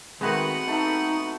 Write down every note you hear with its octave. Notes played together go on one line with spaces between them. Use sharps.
D#3 G#3 A3 B3 C4 F#4 B4 F#5
A3 D#4 A4